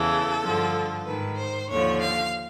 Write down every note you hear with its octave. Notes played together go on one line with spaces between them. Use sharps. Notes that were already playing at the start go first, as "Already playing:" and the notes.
Already playing: E2 C#3 E3 A4
G2 D3 F3
G#2 D#3 B4
C5
D#2 D3 F3 C#5
F5